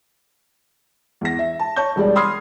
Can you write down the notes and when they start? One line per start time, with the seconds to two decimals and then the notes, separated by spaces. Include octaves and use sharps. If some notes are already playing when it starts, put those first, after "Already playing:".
1.21 E2 A#6
1.39 E5
1.59 A5
1.76 C#5 A5 C#6 G6
1.96 E1 G3 G#3 D5
2.15 B5 C6 D#6 F6 G#6 C7